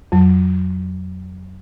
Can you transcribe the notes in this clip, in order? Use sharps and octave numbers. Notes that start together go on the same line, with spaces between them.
F2 F#3